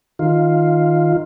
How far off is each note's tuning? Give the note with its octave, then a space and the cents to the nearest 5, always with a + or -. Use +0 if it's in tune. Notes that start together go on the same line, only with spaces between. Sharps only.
D#3 +0 F4 +0